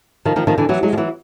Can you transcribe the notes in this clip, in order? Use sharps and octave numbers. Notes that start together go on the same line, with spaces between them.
D#3 F3
D#3 F3
D#3 F3
D3 E3
E3 F#3
F#3 G#3
F3
E3 F#3